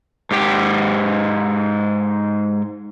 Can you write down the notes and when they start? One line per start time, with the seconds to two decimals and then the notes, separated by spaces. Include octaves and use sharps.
0.31 G#2 G4 G5